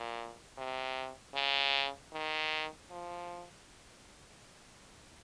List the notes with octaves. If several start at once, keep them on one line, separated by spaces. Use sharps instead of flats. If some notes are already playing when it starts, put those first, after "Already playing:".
Already playing: A#2
C3
C#3
D#3
F3